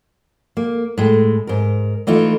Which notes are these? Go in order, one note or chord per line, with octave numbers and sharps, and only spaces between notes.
A#3
A2 G#3
G#2 A#4
E3 A3 D#4 F4